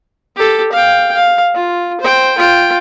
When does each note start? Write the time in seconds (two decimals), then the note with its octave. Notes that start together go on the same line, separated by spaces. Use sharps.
0.36 G4 A4
0.72 F5 G5
1.15 F5
1.55 F4
2.01 C5 G5
2.38 F4 G5